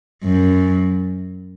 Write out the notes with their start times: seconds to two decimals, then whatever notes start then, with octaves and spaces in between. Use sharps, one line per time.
0.23 F#2